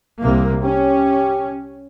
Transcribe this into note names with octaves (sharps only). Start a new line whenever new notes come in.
C2 C3 A#3
C#4 G4